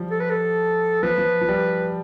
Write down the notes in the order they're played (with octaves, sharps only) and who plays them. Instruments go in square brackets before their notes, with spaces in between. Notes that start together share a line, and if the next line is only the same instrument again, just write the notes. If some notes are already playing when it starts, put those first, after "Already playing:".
Already playing: [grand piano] F3 G3
[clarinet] A4
B4
A4
[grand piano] F3 [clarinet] B4
[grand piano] F3
F3
G3